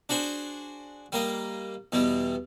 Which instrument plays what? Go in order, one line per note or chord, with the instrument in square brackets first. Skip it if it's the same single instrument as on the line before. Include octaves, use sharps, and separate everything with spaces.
[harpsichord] D4 F#4 G#4 C5
G3 A#3 D#5
E2 B2 G3